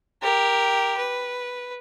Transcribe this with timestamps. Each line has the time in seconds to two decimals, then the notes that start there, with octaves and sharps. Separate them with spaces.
0.22 G4 A#4
0.97 B4